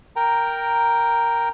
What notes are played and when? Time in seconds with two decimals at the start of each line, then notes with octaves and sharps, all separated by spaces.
0.16 A#4 G5 A#5